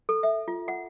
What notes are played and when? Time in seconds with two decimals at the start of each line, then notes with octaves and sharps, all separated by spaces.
0.09 A4
0.23 E5
0.48 F4
0.68 F#5